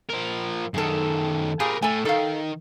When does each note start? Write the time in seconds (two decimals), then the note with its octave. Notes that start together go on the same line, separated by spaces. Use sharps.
0.10 F3 A#4
0.74 F#2 D#3 G#4 A4
1.60 A#2 G4 G#4 A#4 B4
1.82 A2 A4 G#5
2.05 D#3 A4 F5